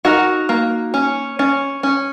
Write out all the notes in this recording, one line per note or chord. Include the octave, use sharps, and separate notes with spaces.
D#4 F#4 A#4
A#3
C#4
C#4
C#4